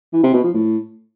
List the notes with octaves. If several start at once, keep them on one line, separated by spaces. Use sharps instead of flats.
E3
C3
B2
F3
A2